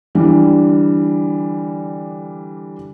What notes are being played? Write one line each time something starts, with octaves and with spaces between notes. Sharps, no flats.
D3 E3 G3 D4